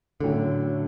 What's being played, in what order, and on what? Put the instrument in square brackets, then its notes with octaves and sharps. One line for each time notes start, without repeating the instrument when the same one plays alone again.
[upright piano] A2 F#3 A3 C#4 [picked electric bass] D3